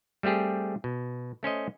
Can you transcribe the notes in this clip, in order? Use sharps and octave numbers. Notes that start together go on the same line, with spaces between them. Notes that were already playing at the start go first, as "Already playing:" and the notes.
G3 A3 C4 G4 G#4
B2
A3 C#4 C5 D#5